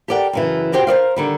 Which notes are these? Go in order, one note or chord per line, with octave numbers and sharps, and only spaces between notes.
G4 A4 A#4 D5 F#5 G5
F#2 C#3 E3
F2 F#4 G4 C5 G5
A#4 C5 D5 F5
D3 D#3 G3